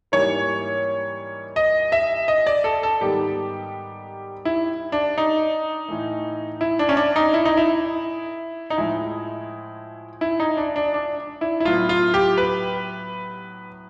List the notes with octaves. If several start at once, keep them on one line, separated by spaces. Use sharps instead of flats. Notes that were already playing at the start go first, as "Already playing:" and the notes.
G#2 E3 G3 A#3 C#5
D#5
E5
D#5
D5
A4
A4
G#2 D#3 G3 B3 G4
E4
D4
D#4
A2 E3 A3
E4
D4
C#4
D4
D#4
E4
D#4
E4
D#4
A2 F3 G#3 E4
E4
D#4
D4
D4
D4
E4
E4
A2 F#3 B3 F4
F4
G4
B4